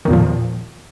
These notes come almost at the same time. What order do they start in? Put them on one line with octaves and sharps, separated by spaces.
D#3 E2 A#2 F3